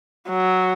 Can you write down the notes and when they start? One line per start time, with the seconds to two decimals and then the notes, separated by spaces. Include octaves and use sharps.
0.30 F#3